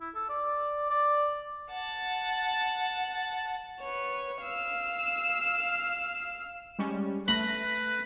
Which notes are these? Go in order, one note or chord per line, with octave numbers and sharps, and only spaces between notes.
E4
A4
D5
D5
F#5 A5
B4 C#5
F5 E6
G3 G#3 C#4
A3 B4 B5 A#6